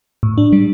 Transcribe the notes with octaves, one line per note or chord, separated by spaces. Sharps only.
A2
D4
G3